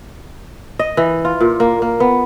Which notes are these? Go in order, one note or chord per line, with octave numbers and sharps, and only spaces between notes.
D#5
E3
F4
A#2
A#3
A#3
B3